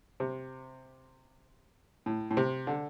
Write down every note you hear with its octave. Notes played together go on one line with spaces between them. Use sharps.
C3
A2
A2
C3
D3